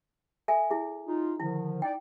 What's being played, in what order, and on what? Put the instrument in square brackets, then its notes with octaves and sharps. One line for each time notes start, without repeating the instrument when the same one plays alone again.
[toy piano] A4 E5 G#5
E4 G#4
[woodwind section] D#4 F4
[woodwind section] D3 D#3 F3 [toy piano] E4
[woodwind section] D#4 D5 [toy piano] G5